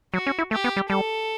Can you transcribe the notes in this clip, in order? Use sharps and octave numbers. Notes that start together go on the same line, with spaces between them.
F#3 F#4
C#4
E4
A3 G4
B3
G3
G3 A4